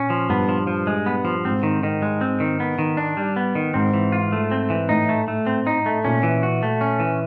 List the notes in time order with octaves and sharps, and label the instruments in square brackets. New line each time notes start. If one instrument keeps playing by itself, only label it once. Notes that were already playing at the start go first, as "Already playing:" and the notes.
Already playing: [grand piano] A#2 [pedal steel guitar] C#4
[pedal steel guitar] F3
[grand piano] G2 [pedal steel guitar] B3
[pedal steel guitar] F3
F3
G#3
B3
F3
[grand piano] G#2 [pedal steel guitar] C4
[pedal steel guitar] D#3
D#3
G#3
C4
D#3
B3
D#3
D4
G3
B3
D#3
[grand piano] G#2 [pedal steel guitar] C4
[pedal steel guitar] E3
F4
A3
C4
E3
[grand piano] A2 [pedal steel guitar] D#4
[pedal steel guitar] A3
A3
C4
D#4
A3
[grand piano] A#2 [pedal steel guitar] C#4
[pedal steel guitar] E3
F#4
A3
C#4
E3